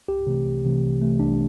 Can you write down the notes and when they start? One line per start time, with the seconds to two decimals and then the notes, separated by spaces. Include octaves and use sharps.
0.08 C2 G4
0.27 C3 E3 A3
0.45 C2
0.65 C3 E3 A3
0.83 C2
1.01 C3 E3 A3
1.19 C2 D4